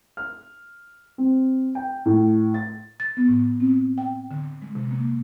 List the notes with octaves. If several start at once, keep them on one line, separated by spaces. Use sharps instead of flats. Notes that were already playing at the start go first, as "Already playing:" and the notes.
F6
C4
G5
A2
A6
A6
B3
A2
C4
G5
D3
G#3
C3
A#3